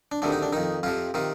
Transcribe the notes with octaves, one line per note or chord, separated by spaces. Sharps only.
D4
D2 C3 D#3 D4
D#4
D4
F2 D#3 D#4
F2 C3 F3 F4
C3 D#3 F4